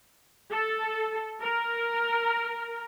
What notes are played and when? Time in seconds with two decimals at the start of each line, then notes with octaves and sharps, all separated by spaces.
0.51 A4
1.41 A#4